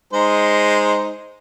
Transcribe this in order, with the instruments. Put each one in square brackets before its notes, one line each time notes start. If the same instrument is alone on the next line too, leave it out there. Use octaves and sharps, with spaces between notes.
[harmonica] G#3 D#4 C5